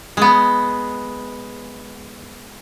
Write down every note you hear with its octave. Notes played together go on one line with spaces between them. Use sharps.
G#3 B3